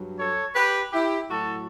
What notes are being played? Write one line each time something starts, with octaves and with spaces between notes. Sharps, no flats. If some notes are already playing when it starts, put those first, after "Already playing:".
Already playing: G2 F#3
A4 C#5
G4 B4
E4 G4
A2 F#3 F#4 A4